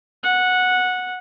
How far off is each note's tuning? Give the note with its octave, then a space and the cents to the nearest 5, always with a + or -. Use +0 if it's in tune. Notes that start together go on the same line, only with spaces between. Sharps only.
F#5 -10